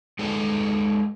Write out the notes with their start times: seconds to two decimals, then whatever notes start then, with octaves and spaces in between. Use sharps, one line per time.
0.19 G#3 D#4 A4 B4 C#5 G5